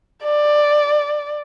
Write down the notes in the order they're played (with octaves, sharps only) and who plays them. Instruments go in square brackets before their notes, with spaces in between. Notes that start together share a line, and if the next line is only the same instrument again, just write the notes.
[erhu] D5